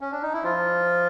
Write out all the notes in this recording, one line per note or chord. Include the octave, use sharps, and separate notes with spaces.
C#4
D4
D#4
E4
F3 F4